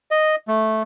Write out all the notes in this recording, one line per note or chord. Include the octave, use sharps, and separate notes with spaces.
D#5
A3